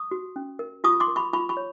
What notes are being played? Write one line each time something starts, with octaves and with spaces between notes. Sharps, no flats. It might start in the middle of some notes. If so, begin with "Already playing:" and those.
Already playing: C#6 D#6
F#4
C#4
A#4
F4 C#6 D#6
C6 D6
A#4
B5 C#6
F4 B5 C#6
B5 C#6
C#5